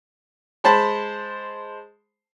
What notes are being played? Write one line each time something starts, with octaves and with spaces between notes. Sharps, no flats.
G#3 C5 A5 B5